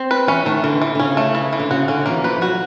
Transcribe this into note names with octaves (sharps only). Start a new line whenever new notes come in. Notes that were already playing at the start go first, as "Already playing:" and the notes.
Already playing: C4
B4
E3 C#4
D#3 A3
D3 E3
E3
D3
C#3 C#4
A3
E3
E3
D3
C#3 F#4
D3 C#4
E3 A#3
F3 B4
F#3 F#4